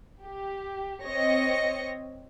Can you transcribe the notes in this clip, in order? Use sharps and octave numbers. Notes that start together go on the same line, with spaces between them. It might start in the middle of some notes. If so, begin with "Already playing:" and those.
G4
C4 C#5 D#5 A#6 C#7